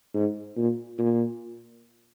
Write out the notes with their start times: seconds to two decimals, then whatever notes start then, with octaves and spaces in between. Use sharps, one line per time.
0.14 G#2
0.57 A#2
0.98 A#2